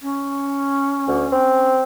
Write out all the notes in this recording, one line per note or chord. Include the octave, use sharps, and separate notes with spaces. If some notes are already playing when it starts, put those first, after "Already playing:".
C#4
D2
C4